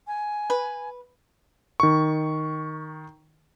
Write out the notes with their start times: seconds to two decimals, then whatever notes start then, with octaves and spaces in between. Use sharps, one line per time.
0.07 G#5
0.50 B4
1.80 D#3 C#6